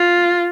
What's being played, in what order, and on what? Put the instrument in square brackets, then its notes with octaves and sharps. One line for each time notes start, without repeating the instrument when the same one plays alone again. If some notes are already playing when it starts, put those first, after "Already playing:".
Already playing: [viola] F4